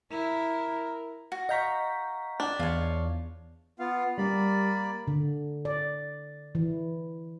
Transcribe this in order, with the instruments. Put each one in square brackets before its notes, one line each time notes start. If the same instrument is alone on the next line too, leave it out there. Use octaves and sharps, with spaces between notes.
[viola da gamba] E4 [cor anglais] A#4
[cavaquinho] F#4
[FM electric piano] D#5 G6 B6 [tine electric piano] F5 A#5 C#6
[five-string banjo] D4
[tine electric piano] E2 [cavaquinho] F4 C#5
[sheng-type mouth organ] B3 F4 F5
[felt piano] G3 [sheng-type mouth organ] A#3 D5 B5
[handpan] D3
D5
E3